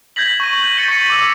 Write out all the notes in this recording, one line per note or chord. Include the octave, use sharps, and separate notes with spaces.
G6 G#6 A#6 B6 F#7
C#6 A#6 D#7
G6
A6 A#6 C#7 D#7 G7
C#6 A#6 B6 C#7
D6 E6